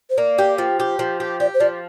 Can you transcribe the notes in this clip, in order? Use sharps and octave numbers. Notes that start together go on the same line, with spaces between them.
C5
A#3 D5
G4
F3
G4
F3
G4
G4 D5
C5
F3 D5